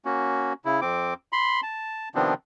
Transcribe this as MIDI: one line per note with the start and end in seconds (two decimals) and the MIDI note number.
0.05 0.53 58
0.05 0.53 61
0.05 0.53 66
0.65 0.80 49
0.65 0.80 64
0.81 1.14 41
0.81 1.14 60
0.81 1.14 86
1.32 1.61 83
1.32 1.61 84
1.63 2.09 81
2.15 2.34 48
2.15 2.34 51
2.15 2.34 53
2.15 2.34 59
2.15 2.34 60
2.15 2.34 62